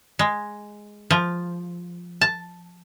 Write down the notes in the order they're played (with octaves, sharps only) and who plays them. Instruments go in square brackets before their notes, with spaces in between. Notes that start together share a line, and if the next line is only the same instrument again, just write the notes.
[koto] G#3
F3
A5